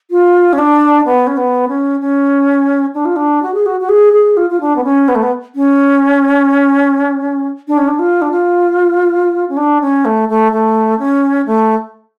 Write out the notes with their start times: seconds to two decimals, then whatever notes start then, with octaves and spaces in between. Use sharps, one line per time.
0.11 F4
0.53 C#4
0.58 D4
1.05 B3
1.27 C#4
1.37 B3
1.68 C#4
2.01 C#4
2.95 D4
3.05 F4
3.16 D4
3.42 F#4
3.54 G#4
3.66 F#4
3.81 F#4
3.89 G#4
4.13 G#4
4.37 F4
4.50 F4
4.61 D4
4.76 B3
4.84 C#4
5.08 B3
5.15 A3
5.23 B3
5.55 C#4
7.68 D4
7.78 C#4
7.88 D4
7.99 F4
8.22 D4
8.31 F4
9.49 C#4
9.57 D4
9.81 C#4
10.05 A3
10.29 A3
10.52 A3
10.99 C#4
11.46 A3